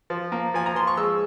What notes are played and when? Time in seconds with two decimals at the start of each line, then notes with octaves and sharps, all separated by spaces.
0.10 F3
0.32 A#3
0.54 F3 G#5
0.66 A#5
0.75 F3 C6
0.87 C#6
0.97 G#3 E6